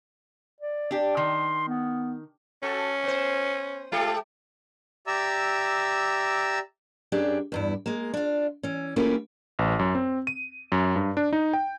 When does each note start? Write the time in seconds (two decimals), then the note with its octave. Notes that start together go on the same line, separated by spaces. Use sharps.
0.61 D5
0.91 D4 G4
1.17 D#3 C6
1.68 B3
2.63 C#4 F#4 A4
3.03 B3 C5
3.92 G#3 F4 G4 A4
5.07 G4 D5 E5 A#5 E6
7.12 F#2 D4 G4 G#4 E5
7.52 E2 G2 E4
7.86 G#3 A#3
8.14 D4 F4
8.63 E3 C#4
8.96 A3 A#3 C#4 E4 F4 G4
9.59 A1
9.79 F#2
9.95 C4
10.27 D#7
10.72 F#2
10.96 G2
11.17 D4
11.33 D#4
11.53 G5